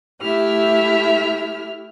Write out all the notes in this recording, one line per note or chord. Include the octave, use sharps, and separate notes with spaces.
A3 E4 G4 E5 F6